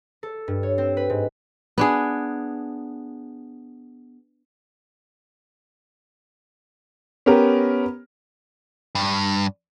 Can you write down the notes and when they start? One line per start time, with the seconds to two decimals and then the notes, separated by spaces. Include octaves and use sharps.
0.23 A4
0.48 G2
0.63 C#5
0.78 C4
0.97 B4
1.10 G#2
1.78 B3 D4 G#4
7.26 B3 C#4 G4 A#4
8.95 G2